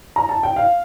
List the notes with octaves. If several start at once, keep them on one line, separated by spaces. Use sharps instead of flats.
A#5
A5
G5
F5